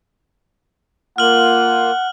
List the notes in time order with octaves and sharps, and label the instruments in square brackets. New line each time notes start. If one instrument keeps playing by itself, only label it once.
[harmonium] A#3 F4 [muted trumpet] F#5 [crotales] F6 F#7